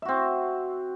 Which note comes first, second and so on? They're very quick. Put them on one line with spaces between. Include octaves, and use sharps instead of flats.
E5 F#4 C4